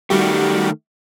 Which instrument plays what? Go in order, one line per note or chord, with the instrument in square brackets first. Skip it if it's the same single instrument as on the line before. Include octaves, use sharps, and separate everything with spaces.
[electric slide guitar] D#3 A3 [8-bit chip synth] G3 F#4 G4